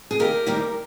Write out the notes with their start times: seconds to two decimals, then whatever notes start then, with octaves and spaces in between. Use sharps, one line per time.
0.11 G#4
0.20 D#2 G4 A#4
0.47 D#3 G3 A#3